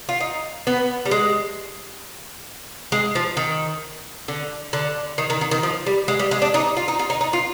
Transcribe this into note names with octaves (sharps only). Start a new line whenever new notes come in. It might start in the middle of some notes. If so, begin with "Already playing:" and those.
F4
D#4
B3
G3
G#3
G#3
F3
D#3
D3
D3
D#3
D#3
D#3
D#3
F3
G3
G#3
G3
G#3
D4
D#4
F4
D#4
F4
D#4
D#4
F4